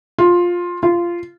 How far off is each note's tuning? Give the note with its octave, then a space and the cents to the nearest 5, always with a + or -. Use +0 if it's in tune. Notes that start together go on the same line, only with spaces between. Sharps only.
F4 +10
F4 -15